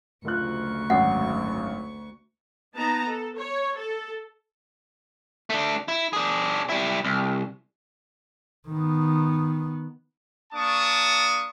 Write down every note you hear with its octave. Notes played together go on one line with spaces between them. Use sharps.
F#1 D2 F4 C#6 F#6
G#1 F#2 F#5
B3 D#4 A5 A#5
A4
C#5
A4
A3 D4
E4
D4 G#4
G3 E4
C2
D#3 B3
A#3 D4 A5 C#6 D#6